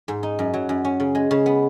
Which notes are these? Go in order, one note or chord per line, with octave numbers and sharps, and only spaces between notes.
G#2
D#4
F#2
F#3
F#2
C#4
C#3
G#3
C#3
B3